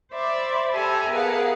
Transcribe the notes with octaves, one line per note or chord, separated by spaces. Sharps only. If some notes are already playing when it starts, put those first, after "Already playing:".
C5 D5 E5 B5
G4 A4 E5 G#5 A#5 B5
B3 G#4 A#4 B4 F5 F#5